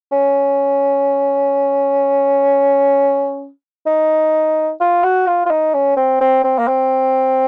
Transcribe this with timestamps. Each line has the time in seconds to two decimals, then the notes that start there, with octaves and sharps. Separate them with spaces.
0.12 C#4
3.86 D#4
4.81 F4
5.04 F#4
5.27 F4
5.46 F4
5.50 D#4
5.74 C#4
5.97 C4
6.21 C4
6.44 C4
6.59 A#3
6.68 C4